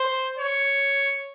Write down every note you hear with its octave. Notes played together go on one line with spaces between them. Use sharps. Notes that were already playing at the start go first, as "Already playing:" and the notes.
Already playing: C5
C#5